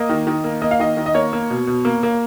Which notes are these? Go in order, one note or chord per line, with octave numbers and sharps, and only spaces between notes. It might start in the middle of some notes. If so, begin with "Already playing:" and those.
Already playing: A#3 D#5
D#3
D#3
A#3
A#3 D#5
F5
D#3 D#5
D#3
D#5
A#3 C#5
A#3
B2
B2
A#3
A#3